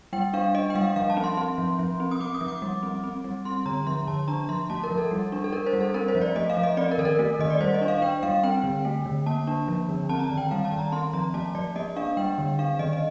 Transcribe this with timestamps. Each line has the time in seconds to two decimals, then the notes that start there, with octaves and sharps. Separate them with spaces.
0.13 G3 G5
0.33 D4 F5
0.55 D4 D#5
0.70 G5
0.75 G3 F5
0.96 F3 F5
1.10 A5
1.17 C4
1.24 C6
1.37 C4 C6
1.58 F3
1.79 F3
2.00 C4
2.11 D#6
2.20 C4 D6
2.34 D#6
2.41 F3
2.48 D6
2.62 G3
2.83 C4
3.04 C4
3.24 G3
3.45 C4 C6
3.66 D3 A#5
3.87 F3 C6
4.07 D3 A5
4.28 D4 A#5
4.49 F3 C6
4.70 A3 A5
4.84 A#4
4.90 F3
4.98 A4
5.11 G3
5.32 D4
5.44 A4
5.52 D4 A#4
5.66 C5
5.73 G3
5.80 A4
5.94 C4 A#4
6.08 C5
6.15 F3
6.21 D5
6.36 A3 D#5
6.50 F5
6.57 F3
6.63 D#5
6.77 C4 D5
6.91 A#4
6.98 D#3 A4
7.05 A#4
7.19 A3
7.39 D#3 D#5
7.50 D5
7.60 G3 C5
7.74 D#5
7.81 D4
7.88 F5
8.02 D4 G5
8.23 G3 F5
8.43 C4 G5
8.64 D3
8.85 A3
9.06 D3
9.26 A#3 A5
9.47 D4
9.68 F3
9.88 D3
10.09 C4 A5
10.19 A#5
10.24 A5
10.30 D#3
10.37 G5
10.51 G3 F5
10.65 A5
10.72 D#3
10.79 A#5
10.92 C4 C6
11.13 F3 A#5
11.34 A3 A5
11.55 F3 D5
11.76 A#3 D#5
11.96 D4 F5
12.17 G3 G5
12.38 D3
12.59 D4 F5
12.79 D#3 D#5
12.93 D#5